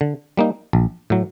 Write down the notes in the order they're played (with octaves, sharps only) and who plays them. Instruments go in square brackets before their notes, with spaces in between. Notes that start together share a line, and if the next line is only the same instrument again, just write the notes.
[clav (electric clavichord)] D3
G3 A#3 D#4
A#1
A2 F#3